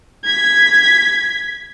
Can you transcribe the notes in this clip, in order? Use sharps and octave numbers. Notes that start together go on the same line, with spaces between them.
G#6 B6